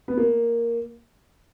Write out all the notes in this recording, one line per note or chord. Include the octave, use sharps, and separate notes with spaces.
B3
A#3